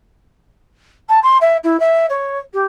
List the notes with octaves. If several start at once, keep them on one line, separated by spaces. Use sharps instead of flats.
A5
C6
E5
E4
E5
C#5
G4